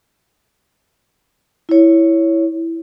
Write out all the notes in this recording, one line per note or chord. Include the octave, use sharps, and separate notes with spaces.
E4 C#5